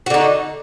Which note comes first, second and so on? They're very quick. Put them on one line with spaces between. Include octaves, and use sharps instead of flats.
F#4 D3 D#4